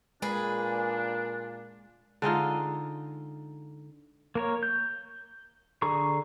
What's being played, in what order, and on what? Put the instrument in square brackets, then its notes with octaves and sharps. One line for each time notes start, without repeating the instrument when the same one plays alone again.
[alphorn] A#2 [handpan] G#3 [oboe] D4 [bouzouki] G#4 B4
[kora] D3 G#3 D#4 F4
[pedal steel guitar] A#3 A#4 C#5
G6
D3 G#4 A#5 C#6